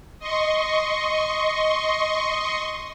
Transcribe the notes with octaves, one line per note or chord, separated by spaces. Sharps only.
D#5 C6 C#6